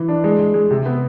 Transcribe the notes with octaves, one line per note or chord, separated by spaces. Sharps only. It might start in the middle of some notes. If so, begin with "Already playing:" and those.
Already playing: E3
D4
G#3
G#3
G#3
C3
B3